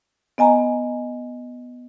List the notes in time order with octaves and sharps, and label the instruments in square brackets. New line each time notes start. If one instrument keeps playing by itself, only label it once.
[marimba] B3 D#5 G#5 A#5